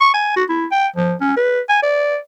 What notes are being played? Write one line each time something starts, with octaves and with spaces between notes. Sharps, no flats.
C#6
G#5
F#4
E4
G5
F3
C#4
B4
G#5
D5